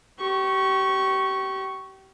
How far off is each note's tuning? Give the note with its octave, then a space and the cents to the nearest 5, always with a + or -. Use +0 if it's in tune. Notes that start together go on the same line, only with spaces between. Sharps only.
G4 -30 C#6 +0